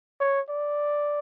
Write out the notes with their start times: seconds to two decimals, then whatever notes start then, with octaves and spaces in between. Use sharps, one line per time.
0.21 C#5
0.50 D5